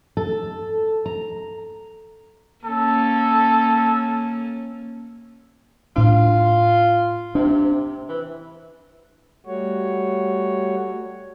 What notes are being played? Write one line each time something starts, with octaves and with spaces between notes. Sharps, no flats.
A4
A#5
A#3 C#4 A4
A2 D4 F4
C3 D4
E3
G3 A3 F#4 C#5